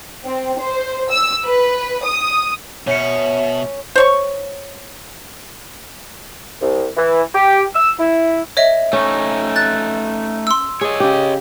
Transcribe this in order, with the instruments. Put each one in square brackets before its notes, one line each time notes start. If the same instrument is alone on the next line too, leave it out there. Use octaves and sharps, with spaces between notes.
[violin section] C4
C5
E6
B4
D#6
[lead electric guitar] B2 [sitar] C#4 [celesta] C#5 C#7 [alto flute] E5
[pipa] C5 C#5 C#6
[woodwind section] C2
E3
G4
E6
E4
[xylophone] C#5 D#5 E5
[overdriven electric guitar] A3 D#4 [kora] C#4
[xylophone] F#6 A6
C6 E6
[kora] G#4 [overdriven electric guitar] C#5 D#5
[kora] C#3 G4